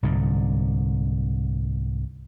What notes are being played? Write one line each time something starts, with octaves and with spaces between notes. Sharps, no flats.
C2 G#2 D3